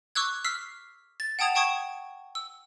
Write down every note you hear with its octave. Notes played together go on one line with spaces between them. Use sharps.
C#6 D6 E6 F#6 G#6
E6 F6 B6 C7
A6
F#5 G5 A5 D#6 G#6 F7
G5 A5 C#6 D#6 G#6
E6